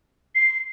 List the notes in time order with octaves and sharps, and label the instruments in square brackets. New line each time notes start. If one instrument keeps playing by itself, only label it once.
[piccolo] C7